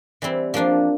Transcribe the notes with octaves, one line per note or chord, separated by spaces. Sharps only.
E3 G3 C4 E4
F3 A#3 D4 F4